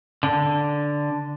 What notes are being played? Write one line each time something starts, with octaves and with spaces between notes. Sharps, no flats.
D3